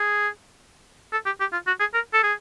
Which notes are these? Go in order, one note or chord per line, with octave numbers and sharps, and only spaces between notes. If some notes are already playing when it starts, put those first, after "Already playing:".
Already playing: G#4
A4
G4
G4
F4
F#4
G#4
A#4
A4
G#4